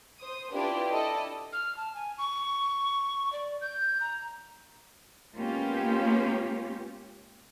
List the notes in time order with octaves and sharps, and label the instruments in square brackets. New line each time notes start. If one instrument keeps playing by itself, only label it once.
[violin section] C5 D#6
D4 E4 F4 G4 B4 D5
E4 A4 D5 D#5
[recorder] F6
A5
G#5
C#6
D5
G6
A#5
[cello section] G#3 A#3 B3 C#4 F4 G4